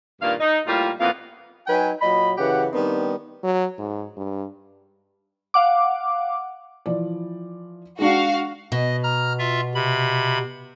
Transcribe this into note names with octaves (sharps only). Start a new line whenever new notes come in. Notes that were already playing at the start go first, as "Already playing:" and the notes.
G2 A#2 D#3 A#3 D5 F5
D#4
A2 G3 A#3 F4
F2 A#2 E3 B3 F5
F#3 D#4 B4 G5 G#5
A#2 F#3 D#5 B5
F#2 C#3 E3 G4 F#5
D#3 G3 B3 C4 D4 D#4
F#3
G#2
G2
F5 F#5 D6
E3 F3 D5
G#3 D4 F#4 F5
B2 D#5
A#5 F6
F4 E5
C3 B5